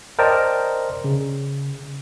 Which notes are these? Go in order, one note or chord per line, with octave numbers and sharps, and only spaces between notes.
A#4 C5 D5 D#5 G5 A5
C#3